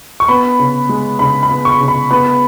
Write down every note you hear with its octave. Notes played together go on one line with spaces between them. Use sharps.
C#6
B3 B5
C#3
G#3
C#3 B5
B5
B3
C#6
C#3
B5
B3 B5